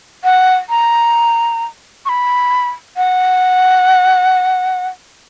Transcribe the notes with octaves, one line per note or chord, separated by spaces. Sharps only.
F#5
A#5
C#6
B5
F#5